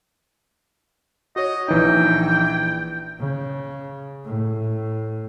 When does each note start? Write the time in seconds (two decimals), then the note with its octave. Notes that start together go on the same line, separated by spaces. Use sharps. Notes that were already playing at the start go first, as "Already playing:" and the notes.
1.36 F#4 C#5 D#5
1.68 A#1 E3 D#4 G5
3.19 C#3
4.25 A2